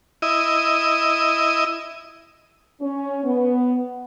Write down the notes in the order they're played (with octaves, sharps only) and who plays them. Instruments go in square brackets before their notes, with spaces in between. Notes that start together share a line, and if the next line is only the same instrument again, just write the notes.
[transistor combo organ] E4 D#5
[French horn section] C#4
B3